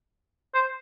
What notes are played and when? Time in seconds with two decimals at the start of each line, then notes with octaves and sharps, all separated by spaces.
0.54 C5